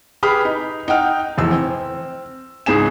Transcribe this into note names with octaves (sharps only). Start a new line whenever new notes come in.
G4 G#4 B4 B5 F6
D#4
D#4 F#5 G5 F6
F1 E2 E6
C4
C#2 G#2 G#4 G#5 E7